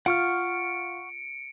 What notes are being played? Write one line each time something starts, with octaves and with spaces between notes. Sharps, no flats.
F4 F#5 C#6 F6 C#7 D7